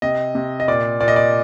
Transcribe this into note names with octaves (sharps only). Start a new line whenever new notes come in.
C3 D#5
C3
D#5
A#2 D5
A#2 D5
D#5
D5